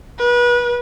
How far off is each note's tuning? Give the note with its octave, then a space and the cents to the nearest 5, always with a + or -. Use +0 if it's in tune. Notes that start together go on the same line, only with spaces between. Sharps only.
B4 -30